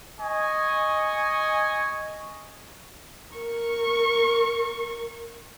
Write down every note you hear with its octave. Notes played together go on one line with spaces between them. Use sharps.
D#5 G#5 C#6
A#4 C#6